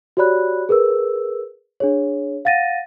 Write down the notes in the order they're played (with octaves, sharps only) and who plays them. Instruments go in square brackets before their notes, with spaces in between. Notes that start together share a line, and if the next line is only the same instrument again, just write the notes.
[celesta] F#4 G4 C#5 D5 B5 F#6
G#4 A#4 B4 E6
D4 G#4 C#5
F5 F#5 A6 A#6 D#7